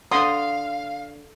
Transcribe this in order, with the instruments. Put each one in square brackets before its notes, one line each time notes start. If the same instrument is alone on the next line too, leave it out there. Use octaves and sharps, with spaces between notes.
[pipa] D3 [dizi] F5 [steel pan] C6 D#6